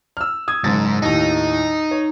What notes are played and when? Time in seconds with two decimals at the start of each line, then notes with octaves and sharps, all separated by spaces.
0.17 E6 F6
0.48 D#6 G#6
0.64 F#1 G#2 A6
1.02 D#2 A2 D#4
1.91 C#5